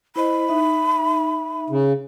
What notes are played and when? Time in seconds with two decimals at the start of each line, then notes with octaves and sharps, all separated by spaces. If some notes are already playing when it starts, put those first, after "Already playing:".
0.16 E4 C5 D#5 B5
0.48 D#4 E5
1.70 C#3